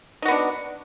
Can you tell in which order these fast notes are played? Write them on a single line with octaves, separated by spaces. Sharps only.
D#4 F#4 B3 D4